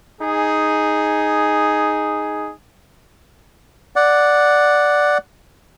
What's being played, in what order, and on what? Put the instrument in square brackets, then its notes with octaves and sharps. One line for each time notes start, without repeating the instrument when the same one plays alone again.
[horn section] D#4 G#4
[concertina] D5 F#5